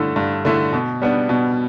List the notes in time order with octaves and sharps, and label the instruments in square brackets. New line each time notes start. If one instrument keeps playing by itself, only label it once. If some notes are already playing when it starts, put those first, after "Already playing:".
Already playing: [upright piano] G2 D3 A3 E4
G2
D3 A3 E4
B2
G3 B3 D4
B2